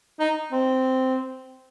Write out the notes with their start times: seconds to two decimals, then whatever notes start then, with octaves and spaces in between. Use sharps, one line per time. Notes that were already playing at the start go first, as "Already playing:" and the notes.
0.20 D#4
0.52 C4